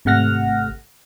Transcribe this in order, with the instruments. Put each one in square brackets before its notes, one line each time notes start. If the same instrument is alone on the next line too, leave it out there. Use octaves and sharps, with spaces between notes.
[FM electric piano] G#1 C3 A3 F#5 F6 A#6